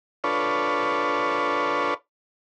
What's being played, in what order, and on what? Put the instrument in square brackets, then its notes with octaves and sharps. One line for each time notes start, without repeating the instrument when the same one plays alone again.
[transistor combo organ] D4 F4 A4 B4 C#5